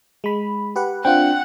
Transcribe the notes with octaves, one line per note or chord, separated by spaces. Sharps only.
G#3 B5
G4 B4 F#5
C4 D4 F4 F#5 G5